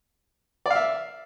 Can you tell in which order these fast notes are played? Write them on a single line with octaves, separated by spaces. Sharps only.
D5 F5 E5